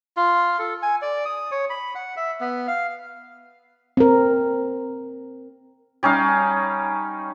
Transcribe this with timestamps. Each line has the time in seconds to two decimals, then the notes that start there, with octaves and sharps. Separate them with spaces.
0.17 F4
0.59 A4
0.82 G#5
1.02 D5
1.25 D#6
1.51 C#5
1.70 B5
1.95 F#5
2.17 E5
2.40 B3
2.68 F5
3.97 C4 A#4
6.03 G3 C#4 D#4 F5